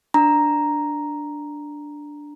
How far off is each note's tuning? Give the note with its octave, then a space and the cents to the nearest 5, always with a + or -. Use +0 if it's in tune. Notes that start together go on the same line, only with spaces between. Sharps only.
D4 +0 A#5 +0